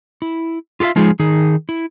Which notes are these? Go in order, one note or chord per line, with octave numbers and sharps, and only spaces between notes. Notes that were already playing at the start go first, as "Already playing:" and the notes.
E4
F4 G4 A4 E5 F5
F3 G#3 D#4 F4 G#4
D#3 D#4 G#4
E4